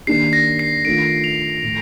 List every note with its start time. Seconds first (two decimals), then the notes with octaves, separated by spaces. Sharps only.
0.07 D#3 A#3 D4 G4 C7
0.33 A#6
0.59 C7
0.85 D#3 A3 D4 F4 D7
1.24 F7
1.62 A2 F3 F7